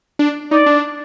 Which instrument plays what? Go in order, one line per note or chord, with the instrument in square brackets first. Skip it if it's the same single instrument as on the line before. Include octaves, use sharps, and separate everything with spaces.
[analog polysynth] D4
[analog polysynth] D#4 [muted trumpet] D5
[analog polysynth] D4